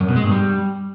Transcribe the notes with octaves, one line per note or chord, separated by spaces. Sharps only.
F#2
B2
G#3
G2
G3